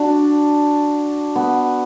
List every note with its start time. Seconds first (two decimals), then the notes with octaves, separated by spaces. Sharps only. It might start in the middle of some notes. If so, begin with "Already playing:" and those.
Already playing: D4 F#4
1.35 B3